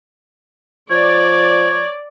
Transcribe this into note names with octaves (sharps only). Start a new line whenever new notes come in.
F3 C#5 D5